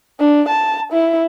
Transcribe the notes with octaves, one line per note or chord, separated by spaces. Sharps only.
D4
A5
E4